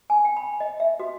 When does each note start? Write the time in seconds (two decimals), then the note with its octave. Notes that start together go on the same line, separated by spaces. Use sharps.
0.10 G#5
0.25 G5
0.37 B5
0.60 D#5
0.80 E5
0.99 F#4